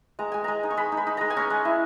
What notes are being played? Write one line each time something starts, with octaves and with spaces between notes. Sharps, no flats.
G#3 A#5
G#3 G#5
G#3 A#5
D#4
C#6
G#3 B5
D#4
B5
D#4
G#3 A#5
G#5
C#4 A#5
G#3
E4